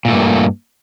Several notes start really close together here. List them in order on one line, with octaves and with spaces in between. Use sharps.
A#2 A3 G2 A#3